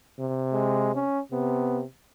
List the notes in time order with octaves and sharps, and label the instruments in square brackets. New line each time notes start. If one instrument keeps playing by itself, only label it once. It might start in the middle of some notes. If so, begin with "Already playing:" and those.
[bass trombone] C3
[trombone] G#3
C#4
[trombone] C3 [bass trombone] B3